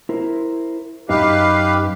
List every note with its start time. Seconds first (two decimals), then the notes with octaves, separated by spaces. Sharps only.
0.09 E4 A#4 C5
1.09 F#2 D#4 G4 B4 D#5 F5